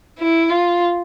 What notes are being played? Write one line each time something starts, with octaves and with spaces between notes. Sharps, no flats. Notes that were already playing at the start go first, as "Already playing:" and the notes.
E4
F4